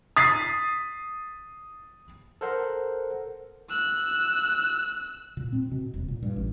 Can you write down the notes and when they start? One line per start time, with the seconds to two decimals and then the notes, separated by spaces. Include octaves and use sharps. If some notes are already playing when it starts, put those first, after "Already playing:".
0.17 D#6 A6 B6 C7
2.41 A4 A#4 C5 F#5
3.70 E6 F#6
5.37 A#2
5.52 C4
5.71 B2
5.94 D#1
6.08 A#2
6.23 G2
6.36 A1